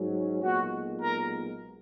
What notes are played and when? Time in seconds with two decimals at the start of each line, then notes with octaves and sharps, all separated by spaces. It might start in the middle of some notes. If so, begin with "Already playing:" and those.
Already playing: G#2 F#3 C#4
0.42 B1 A#2 G#3 B3 F#4
1.00 A#4